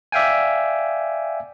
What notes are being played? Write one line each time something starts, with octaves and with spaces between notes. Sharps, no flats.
D5 E5 F5 G5 G#5